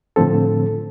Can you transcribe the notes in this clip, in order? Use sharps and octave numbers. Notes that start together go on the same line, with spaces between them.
A2 D3 F3 C4 A4